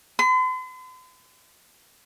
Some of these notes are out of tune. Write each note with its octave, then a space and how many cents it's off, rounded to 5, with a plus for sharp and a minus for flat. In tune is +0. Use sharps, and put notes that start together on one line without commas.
C6 -45